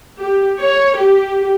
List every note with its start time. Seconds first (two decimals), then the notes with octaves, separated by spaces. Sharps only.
0.18 G4
0.58 C#5
0.94 G4